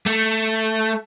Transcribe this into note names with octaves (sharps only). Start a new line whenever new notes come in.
A3